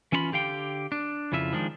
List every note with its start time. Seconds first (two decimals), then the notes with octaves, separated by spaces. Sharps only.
0.12 E3 C#4 E4 F4 B5
0.32 D3 G4 F5 G5
0.92 D4
1.32 F2 C#3 E4 F4 E5
1.53 D#3 F3 G#3 D4